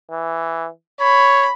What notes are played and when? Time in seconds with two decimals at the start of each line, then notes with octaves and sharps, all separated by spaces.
0.11 E3
1.00 C#5 B5